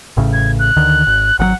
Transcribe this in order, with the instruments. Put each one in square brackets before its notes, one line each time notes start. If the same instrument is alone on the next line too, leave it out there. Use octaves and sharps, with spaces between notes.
[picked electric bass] A1 A2 C#3
[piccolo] G#6
F#6
[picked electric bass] D2 D3 D#3
G#1
[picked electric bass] G#1 D3 F#3 [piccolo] F#5